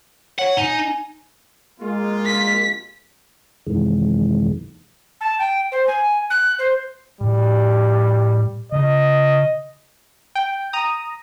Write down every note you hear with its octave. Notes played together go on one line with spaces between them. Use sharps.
C#5 F#5
D#4 G#5
G#3 A#3 F4
B6
F#2 C3 D#3 E3 G#3
A5
G5
C5
G#5
F#6
C5
A2 G3
C#3 D#5
G5
A#5 D#6